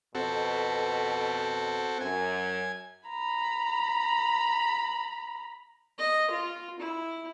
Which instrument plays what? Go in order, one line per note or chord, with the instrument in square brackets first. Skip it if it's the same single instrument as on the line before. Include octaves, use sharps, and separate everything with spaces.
[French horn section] F2 B2 [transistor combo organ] C4 F#4 A4
[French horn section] F#2 [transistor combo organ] G#5
[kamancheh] A#5 B5
[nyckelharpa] D#5
F4
E4